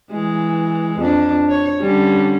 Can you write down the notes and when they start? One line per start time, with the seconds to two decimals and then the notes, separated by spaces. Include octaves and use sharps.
0.11 E3 G#3
0.98 F2 D4
1.49 C#5
1.79 D3 G3 C#4